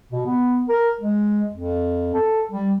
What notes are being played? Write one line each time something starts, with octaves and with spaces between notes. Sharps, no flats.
B2
B3
A#4
G#3
F2
A4
G3